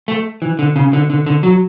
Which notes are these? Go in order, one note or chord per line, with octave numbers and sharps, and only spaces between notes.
A3
E3
D3
C#3
D3
D3
D3
F#3